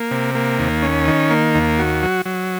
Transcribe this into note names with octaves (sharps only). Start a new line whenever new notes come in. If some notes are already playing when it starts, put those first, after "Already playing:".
Already playing: A#3
C3
A#3
D#2
C#4
D#3
A#3
D#2
F#4
F#3
F#3